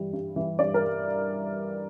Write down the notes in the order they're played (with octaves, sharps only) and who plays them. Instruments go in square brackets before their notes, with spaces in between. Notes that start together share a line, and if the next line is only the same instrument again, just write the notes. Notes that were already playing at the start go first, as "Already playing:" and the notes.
Already playing: [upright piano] G2 E3 G3
G2
E3 G3
G2 D5
A#4
G3